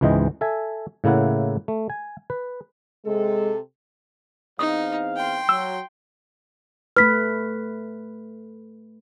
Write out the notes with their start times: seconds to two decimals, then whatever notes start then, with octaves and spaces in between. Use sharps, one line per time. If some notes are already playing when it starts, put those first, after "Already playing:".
0.01 C#2 G#2 E3 G#3 D#5 G5
0.41 A4 E5 G#5
1.04 A2 C#3 A#3 E4 F#5
1.68 A3
1.90 G#5
2.30 B4
3.05 C3 G#3 A4
4.59 E2 C4 D#4 F5 D#6
5.17 G5 C6
5.49 F#3 E6
6.97 A3 B4 F6 B6